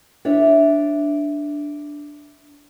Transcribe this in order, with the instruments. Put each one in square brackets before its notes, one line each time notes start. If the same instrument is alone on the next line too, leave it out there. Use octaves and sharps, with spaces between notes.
[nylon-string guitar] D4 C#5 E5